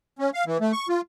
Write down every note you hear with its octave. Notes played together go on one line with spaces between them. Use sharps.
C#4
F5
E3
A3
C#6
F4